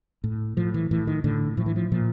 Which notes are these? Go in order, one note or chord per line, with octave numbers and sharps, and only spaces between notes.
A2
A2 F3
E3
A2 E3
D#3
A2 D3
A2 F3
E3
F3
A#2 F3